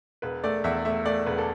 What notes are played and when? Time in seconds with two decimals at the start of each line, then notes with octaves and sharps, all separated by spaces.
0.22 E1 B4
0.44 A3 D5
0.64 E2 E5
0.85 A3 E5
1.06 A3 D5
1.26 E1 B4
1.38 A4